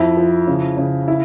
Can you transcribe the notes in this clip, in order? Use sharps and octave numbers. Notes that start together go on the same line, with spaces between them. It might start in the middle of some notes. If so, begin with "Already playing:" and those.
Already playing: F2 E4
F3
C#3
C#3
E4